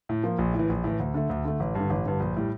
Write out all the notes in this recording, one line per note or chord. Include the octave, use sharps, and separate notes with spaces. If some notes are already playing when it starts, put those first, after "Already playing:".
A2
F3 A#3
A#1
A2
E3
A#1
A2 E3
D2
D3 A3
D2
D3 A3
A1
G2 D3
A1
G2 D3
A#1
A2 G3